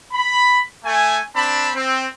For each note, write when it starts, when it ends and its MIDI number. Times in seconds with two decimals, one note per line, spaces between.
0.13 0.60 83
0.85 1.21 57
0.85 1.21 80
1.36 1.69 60
1.36 1.69 62
1.36 1.69 81
1.36 1.69 83
1.75 2.07 60